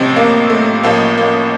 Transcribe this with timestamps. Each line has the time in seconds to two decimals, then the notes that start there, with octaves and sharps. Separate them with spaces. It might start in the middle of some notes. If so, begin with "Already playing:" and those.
Already playing: A1 A2 C3 F3 C4
0.16 A#3
0.50 A3
0.83 A1 A2 F3 A#3
1.17 A#3